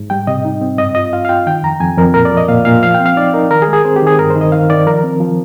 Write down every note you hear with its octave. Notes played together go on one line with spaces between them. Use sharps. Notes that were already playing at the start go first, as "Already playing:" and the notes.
Already playing: G#2
G3 G5
C3 D#5
D#4
C4
G2 D#5
F4 D#5
F4 F5
F5
F4 G5
D#3 G5
F2 A#5
F2 G#5
F2 A#4
A#2 A#4
D5
F3
D#5
A#2 F5
A#2 F5
F3 F5
C4 G5
F5
D#4 D5
D#4 A#4
D#3 A#4
G#4
G#3
G#4
C4 C5
G4
D#3 G#4
G2 A#4
C5
D#3
D#5
D#3 F5
D#3 D5
F3 A#4
C4
F3